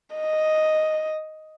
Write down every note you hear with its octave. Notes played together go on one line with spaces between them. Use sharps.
D#5